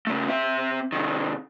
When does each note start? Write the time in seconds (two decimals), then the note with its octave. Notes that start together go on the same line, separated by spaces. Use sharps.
0.07 C#3 A3
0.28 C4 E5
0.92 C3 D#3